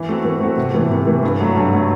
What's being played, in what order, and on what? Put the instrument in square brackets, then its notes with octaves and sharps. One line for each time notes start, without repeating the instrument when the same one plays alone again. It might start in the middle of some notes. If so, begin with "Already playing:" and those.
Already playing: [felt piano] E3
A3 C4 F#4
E3
A3 C4 F#4
C3
E3 A3
C3
E3 A3
G2
F#3 A3
G2
F#3 A3